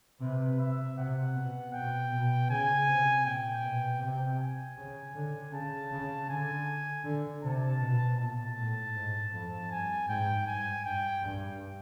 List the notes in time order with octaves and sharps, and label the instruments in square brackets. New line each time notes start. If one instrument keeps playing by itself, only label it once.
[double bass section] C3 [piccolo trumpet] B4
[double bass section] C3 [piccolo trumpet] E5
[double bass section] C3 [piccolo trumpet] F#5
[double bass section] B2
[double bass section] B2 [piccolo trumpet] G5
[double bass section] B2
[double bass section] C#3 [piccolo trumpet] G#5
[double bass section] C3
[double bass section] A#2 [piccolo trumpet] G5
[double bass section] B2
[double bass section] C3 [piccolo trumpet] G5
[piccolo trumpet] G#5
[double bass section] C#3
D3
[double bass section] C#3 [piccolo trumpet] A5
[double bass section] C#3
[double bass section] D3 [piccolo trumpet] G#5
[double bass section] D3
[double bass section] C3 [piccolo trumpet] A5
[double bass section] B2
[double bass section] A#2 [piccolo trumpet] A5
[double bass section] A2
G#2
F2
[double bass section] G2 [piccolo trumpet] G#5
[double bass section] G#2 [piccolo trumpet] G5
[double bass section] G2 [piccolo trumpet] G#5
[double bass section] G2 [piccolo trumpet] G5
[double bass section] G2